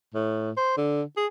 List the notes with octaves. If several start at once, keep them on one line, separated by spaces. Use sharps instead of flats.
A2
C5
D3
G#4